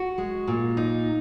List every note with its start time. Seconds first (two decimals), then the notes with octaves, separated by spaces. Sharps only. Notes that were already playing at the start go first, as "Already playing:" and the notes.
Already playing: F#4
0.18 G#3
0.47 A#2
0.77 D#4